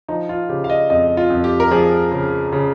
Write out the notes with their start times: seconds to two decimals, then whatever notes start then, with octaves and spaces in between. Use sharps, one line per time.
0.08 F3 D#4
0.29 F4
0.49 C#3 G4
0.64 F5
0.70 D#5
0.90 F2 D#5
1.17 F4
1.30 F2
1.44 G4
1.60 A#4
1.71 F3 G#4
2.11 C#3
2.53 C#3